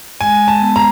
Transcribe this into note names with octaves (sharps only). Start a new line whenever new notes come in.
G#3 G#5
A5
B3
A#5